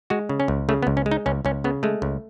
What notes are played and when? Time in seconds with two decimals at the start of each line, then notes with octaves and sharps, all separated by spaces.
0.10 G#3 F#4
0.29 C#3
0.40 C#4
0.48 C#2
0.69 C#3 A3
0.83 B3
0.87 C#2
0.97 C#4
1.06 G#3
1.11 D#4
1.26 C#2 C#4
1.45 C#2 C#4
1.64 C#3 B3
1.83 G#3 A3
2.02 C#2